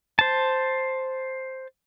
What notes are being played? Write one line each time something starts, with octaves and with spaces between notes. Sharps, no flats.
C5 A5